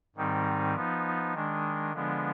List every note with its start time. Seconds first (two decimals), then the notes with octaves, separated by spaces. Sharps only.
0.16 G#2 D#3 G3 C4 D#4
0.75 F3 B3 D#4
1.34 D#3 G#3 D4
1.93 D3 F3 G#3 B3 D4